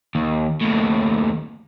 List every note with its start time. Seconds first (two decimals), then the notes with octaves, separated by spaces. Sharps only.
0.15 D#2
0.61 D#2 A2